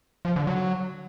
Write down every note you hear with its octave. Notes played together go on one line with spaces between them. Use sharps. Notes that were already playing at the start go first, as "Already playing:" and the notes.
F3
D3
F#3